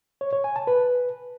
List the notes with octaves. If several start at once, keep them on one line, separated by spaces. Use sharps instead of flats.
C#5
C#5
G#5
A5
B4